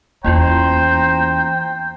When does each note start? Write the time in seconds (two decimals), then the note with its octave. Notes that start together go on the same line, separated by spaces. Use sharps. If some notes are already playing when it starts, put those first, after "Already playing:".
0.25 E2 A#3 C#4 E4 F4 C5 G5 A#5